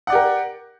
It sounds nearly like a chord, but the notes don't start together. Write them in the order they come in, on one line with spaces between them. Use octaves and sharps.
F#5 D5 G4 A#4